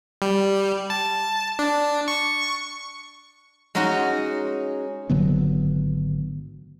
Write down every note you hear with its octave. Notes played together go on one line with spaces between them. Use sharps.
G3
A5
D4
C#6
G#3 C#4 D#4 F#4
G#1 D3 F#3 B3